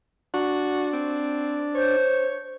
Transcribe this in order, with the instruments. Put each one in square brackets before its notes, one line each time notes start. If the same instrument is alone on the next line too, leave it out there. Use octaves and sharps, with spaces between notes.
[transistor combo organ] D4 [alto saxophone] F#4
[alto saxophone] C4
[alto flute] C5 [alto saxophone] C#5